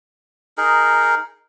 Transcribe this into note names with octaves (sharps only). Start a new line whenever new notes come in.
D#4 G#4 A#4